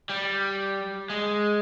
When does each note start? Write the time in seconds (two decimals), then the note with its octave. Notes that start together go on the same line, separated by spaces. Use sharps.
0.09 G3
1.10 G#3